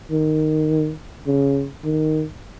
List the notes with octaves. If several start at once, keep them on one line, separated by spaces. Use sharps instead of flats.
D#3
C#3
D#3